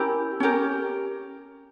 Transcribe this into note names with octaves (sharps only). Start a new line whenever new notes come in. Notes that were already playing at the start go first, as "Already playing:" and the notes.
Already playing: C#4 E4 G4 A#4
C#4 G4 A#4